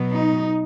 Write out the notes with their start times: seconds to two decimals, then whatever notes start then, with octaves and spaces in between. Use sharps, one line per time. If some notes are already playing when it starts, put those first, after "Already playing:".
Already playing: B2 F#3 B3
0.13 D#4